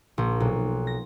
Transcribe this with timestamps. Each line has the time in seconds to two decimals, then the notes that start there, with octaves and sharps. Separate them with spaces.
0.18 A#1
0.40 B1
0.87 A#6